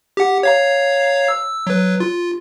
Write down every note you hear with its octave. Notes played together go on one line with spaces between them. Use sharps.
G4 F#5
C#5 F5 A#5
E6
F#3 B4
F4